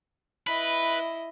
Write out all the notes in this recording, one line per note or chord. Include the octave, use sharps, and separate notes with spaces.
E4 B4 D#5